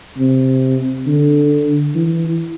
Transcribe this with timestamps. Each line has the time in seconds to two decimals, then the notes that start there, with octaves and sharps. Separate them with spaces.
0.18 C3
1.07 D3
1.95 E3